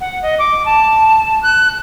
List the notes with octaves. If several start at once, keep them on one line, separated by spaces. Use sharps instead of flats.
F#5
D#5
D6
A5
F#6